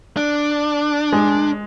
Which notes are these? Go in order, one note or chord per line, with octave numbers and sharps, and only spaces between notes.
D4
G#3